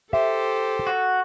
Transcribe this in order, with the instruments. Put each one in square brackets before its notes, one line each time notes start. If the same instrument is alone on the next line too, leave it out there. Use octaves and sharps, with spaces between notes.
[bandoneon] G4 C5 [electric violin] A4 [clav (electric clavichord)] E5
[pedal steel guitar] F#4